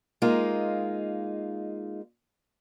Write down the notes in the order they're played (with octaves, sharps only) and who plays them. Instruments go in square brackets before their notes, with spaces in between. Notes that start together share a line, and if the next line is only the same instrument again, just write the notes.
[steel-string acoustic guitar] G#3 A#3 D#4 F4